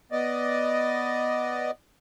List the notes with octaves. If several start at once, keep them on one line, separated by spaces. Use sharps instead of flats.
B3 D5 D#5